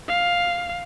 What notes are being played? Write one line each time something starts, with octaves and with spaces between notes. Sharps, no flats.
F5